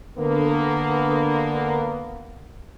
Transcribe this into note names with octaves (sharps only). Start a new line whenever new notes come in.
D3 A#3 B3